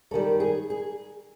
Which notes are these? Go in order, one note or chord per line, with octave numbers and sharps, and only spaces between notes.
F#2 D#3 G3 A4
G#4
G#4